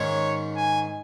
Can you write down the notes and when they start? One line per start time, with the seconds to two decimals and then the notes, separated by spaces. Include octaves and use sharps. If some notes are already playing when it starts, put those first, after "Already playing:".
Already playing: G#2 D#3 G#3 C#4 C#5
0.56 G#5